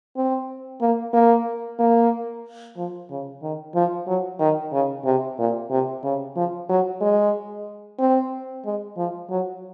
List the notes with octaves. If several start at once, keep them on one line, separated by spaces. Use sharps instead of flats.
C4
A#3
A#3
A#3
F3
C#3
D#3
F3
F#3
D#3
C#3
C3
A#2
C3
C#3
F3
F#3
G#3
C4
G#3
F3
F#3